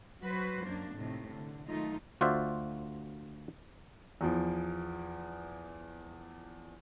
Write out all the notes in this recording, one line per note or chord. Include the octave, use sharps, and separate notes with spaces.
F#3 F#4 B4 C5
F#2 A#3 D4
A2 C3 D#3
D3
D#3 F#3 A3 D#4 F4
D2 F4 F#4 C5 D5 E5
E2 F3